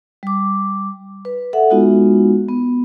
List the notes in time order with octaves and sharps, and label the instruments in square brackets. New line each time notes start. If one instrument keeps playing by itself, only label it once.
[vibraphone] G3 D6
B4
A4 E5 F#5
G#3 B3 D#4 F4 F#4
B3